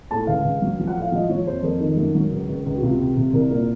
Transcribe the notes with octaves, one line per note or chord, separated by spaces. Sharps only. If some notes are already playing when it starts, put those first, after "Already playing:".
A2 A5
C#2 F5
C#2
F#3
F3
F#5
A2
F5
F3 D#5
F3 C#5
F2 C5
F2 A#4
D#3
F#2
F#3
C#2
C#2
C#2
F#4
C3 F4
C3
C3
C2 A#4
A#2 A#4